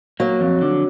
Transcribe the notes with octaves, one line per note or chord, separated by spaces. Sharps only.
F#3 A#3
F2
D3